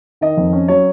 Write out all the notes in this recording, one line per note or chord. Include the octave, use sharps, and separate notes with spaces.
D#3 D#5
F2
C#4
F#3 C#5